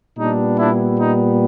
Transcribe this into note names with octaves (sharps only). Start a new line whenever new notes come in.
A#2 G3 B3 D4 D#4
D4 E4
D#4